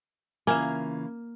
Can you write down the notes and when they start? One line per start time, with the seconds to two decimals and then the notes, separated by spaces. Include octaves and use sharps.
0.47 C#3 E3 A#3 F4 E5 G#5